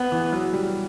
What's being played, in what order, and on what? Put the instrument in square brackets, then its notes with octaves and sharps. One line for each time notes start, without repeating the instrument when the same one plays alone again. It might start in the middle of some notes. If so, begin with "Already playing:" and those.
Already playing: [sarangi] B3
[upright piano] E3
F#3
G3